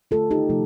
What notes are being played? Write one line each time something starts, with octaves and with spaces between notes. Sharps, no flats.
D3 A3 F4 A4
D#4 G4
C3 F3 A3